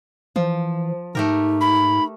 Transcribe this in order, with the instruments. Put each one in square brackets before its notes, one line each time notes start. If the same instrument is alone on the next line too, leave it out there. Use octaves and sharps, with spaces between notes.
[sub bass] E3 [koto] F3
[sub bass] G#2 [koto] A3 G4 A#4 [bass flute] D#4
[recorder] B5